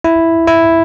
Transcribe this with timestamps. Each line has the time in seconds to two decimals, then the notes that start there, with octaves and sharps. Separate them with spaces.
0.04 E4
0.48 E4